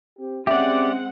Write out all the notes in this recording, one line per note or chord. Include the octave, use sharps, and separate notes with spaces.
C4 G4
G#3 C4 C#4 G4 D5 E5 F#5